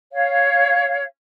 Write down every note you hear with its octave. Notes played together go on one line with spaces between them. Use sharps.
C#5 F5